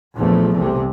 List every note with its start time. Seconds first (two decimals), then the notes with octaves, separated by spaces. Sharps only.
0.15 A#1 E2 F3 A3
0.57 C2 C3